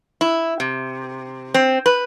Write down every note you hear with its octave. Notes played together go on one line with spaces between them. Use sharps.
E4
C3
C4
B4